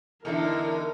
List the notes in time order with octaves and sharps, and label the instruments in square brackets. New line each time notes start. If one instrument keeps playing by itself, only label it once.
[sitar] E2 D3 [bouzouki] D#3 A4 E5 [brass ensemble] D#4 E4 [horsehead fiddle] A#4